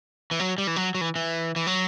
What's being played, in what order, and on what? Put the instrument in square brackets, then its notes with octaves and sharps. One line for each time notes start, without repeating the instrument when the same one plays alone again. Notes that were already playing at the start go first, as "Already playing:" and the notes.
[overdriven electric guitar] E3
F#3
G3
E3
F#3
F#3
E3
E3
E3
F#3